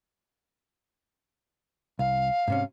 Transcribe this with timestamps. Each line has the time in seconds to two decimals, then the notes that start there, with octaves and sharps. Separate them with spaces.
1.99 C2 F5
2.48 G#2 C3 C#4